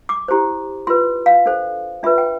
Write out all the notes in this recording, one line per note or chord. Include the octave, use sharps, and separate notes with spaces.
D6
E4 G4 C5
F4 B4 C6
F5
D4 A4 C5
D4 F4 B4 E5
G5